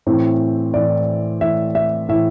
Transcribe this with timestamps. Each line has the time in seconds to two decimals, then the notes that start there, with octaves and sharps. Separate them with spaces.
0.07 A2 E3 C4
0.74 A2 E3 D5
1.41 A2 E3 E5
1.75 E5
2.09 A2 E3 E5